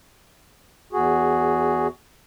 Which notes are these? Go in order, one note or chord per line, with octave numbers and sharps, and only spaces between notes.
E2 F#4 G#4